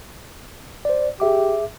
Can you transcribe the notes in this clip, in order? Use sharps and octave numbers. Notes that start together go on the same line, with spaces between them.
C5 D5
G4 G#4 E5 D6